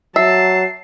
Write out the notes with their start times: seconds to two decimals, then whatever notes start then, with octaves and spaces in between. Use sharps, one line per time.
0.16 F#3 E5 A5 C7